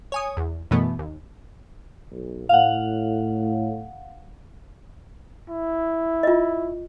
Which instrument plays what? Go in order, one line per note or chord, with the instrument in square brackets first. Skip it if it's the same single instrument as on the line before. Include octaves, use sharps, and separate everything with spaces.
[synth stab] C#5 G#5 D#6
E2
F#2 B2 E3 A3 B3
D#2
[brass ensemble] B1
[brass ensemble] A2 [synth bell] F5 F#5
[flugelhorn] E4
[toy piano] F4 D#5